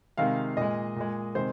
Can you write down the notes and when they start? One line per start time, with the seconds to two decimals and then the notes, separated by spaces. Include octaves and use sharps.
0.17 C3 D#3 G#3 F5
0.57 A#2 G#3 D#5
0.96 A#2 G#3
1.35 C3 D#3 G#3 C5